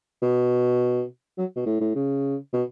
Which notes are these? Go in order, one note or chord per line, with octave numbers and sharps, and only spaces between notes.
B2
F#3
B2
A2
A2
C#3
B2